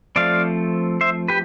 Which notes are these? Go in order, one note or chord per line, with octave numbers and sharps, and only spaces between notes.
F3 A3 C4 D5 F5
C5 E5
G4 B4